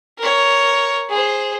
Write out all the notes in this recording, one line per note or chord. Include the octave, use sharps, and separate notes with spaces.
A#4 C#5
G#4 C5